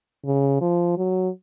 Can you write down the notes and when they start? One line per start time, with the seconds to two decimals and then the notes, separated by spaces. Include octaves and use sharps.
0.25 C#3
0.61 F3
0.97 F#3